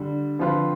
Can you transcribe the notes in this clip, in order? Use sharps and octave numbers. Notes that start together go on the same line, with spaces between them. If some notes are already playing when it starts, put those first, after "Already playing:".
Already playing: D3 G3 D4
D3 F3 C4 F4 B4